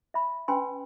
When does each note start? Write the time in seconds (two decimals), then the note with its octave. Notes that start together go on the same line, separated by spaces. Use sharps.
0.14 E5 B5
0.48 C#4 B4 G5 G#5 B5 C6